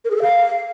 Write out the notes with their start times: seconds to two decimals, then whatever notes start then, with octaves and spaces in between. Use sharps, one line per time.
0.05 A#4
0.11 G#4
0.16 A4
0.22 F5